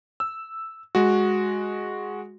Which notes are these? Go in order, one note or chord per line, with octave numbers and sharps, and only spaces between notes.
E6
G#3 F#4